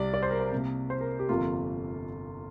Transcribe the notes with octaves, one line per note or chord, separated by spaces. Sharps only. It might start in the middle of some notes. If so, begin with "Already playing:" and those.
Already playing: C2 C3 G3 D5
D5
C5
A#4
C5
C2 C3 A#3
C5
A#4
G4
G1 F2 C3 A#3 F4